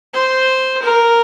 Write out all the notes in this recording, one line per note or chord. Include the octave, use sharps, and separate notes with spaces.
C5
A#4